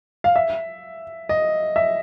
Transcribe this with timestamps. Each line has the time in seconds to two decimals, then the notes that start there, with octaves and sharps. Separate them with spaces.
0.24 F5
0.36 E5
1.29 D#5
1.76 E5